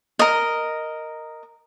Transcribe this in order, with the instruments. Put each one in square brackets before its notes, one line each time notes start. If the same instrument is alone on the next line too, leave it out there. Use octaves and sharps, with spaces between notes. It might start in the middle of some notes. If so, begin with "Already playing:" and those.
[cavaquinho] A#4 D#5